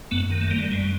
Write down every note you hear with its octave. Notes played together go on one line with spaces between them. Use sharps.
F#2 A3 B3
D#3
A3
G3 A#3
A3
F#2 G#3